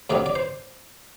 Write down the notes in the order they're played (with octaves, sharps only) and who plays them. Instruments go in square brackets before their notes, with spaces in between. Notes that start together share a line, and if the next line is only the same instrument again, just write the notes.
[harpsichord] D2 C3 F#3 D5
D5
C5